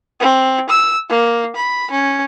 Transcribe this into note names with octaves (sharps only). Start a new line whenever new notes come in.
C4
E6
A#3
B5
C#4